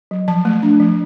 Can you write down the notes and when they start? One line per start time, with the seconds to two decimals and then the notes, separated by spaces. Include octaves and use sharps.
0.11 F#3
0.28 F3 A5
0.45 A3
0.63 D4
0.80 F3